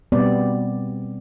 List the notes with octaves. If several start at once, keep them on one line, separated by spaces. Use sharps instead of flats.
B2 G3 B3 C4 D5